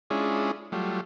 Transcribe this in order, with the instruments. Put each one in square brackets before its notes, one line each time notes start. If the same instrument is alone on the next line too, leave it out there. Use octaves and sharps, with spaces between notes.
[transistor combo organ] G#3 C#4 D4 E4 F4 G#4
F#3 G3 A3 F4